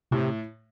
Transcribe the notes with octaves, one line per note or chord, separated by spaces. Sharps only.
A2 C3